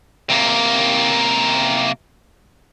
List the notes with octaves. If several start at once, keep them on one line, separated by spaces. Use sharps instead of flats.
C3 A#3